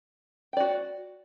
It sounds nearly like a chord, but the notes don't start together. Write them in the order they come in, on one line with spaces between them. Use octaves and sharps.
G5 D5 F#4